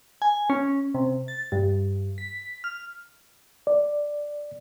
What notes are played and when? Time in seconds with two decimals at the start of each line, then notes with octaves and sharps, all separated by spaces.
0.22 G#5
0.50 C#4
0.95 C3
1.28 A6
1.52 G2
2.18 B6
2.64 F6
3.67 D5